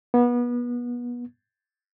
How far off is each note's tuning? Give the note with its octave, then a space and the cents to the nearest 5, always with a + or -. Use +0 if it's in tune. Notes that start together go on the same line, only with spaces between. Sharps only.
B3 -30